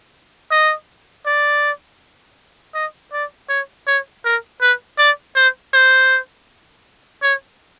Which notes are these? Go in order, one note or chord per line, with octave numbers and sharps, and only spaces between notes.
D#5
D5
D#5
D5
C#5
C#5
A#4
B4
D5
C5
C5
C#5